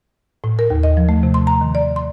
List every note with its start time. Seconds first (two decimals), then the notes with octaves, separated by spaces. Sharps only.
0.44 A2
0.59 A#4
0.70 D#2
0.83 D#5
0.97 F3
1.09 A3
1.23 C3
1.34 C6
1.47 A#5
1.61 D#3
1.75 D5
1.96 C6